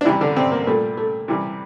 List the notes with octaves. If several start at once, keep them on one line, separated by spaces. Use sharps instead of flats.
D4
C3 E3 G3 E4
D3 D4
C3 C4
A#3
A#2 G3 A3
A3
C3 E3 G3